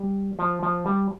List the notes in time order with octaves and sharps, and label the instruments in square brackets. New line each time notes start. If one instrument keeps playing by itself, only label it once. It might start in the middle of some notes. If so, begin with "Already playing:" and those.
Already playing: [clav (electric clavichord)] G3
F3
F3
G3